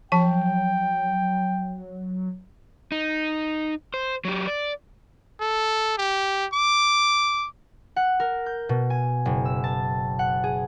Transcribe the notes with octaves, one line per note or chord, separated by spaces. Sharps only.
F3 F#3 G5 A5
D#4
C5
F#3 G4
D5
A4
G4
D6
F#5
A#4
G6
B2
G#5
F#1
E6
A5
F#5
G#4